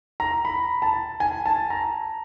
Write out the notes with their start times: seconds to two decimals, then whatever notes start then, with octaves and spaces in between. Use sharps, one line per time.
0.20 A#5
0.45 B5
0.82 A5
1.20 G#5
1.46 A5
1.70 A#5